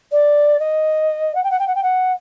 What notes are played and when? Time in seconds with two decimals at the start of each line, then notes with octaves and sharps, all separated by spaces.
0.12 D5
0.60 D#5
1.35 F#5
1.44 G5
1.51 F#5
1.59 G5
1.67 F#5
1.75 G5
1.83 F#5